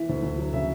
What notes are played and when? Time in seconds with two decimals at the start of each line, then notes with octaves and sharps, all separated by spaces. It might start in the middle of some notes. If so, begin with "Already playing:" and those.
Already playing: E3 E5
0.09 D2
0.23 D2
0.38 F#3
0.53 C#3 E5